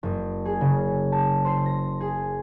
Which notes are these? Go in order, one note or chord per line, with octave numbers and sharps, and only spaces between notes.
F#1
G#4
C#3
A5
C5
A#6
G#4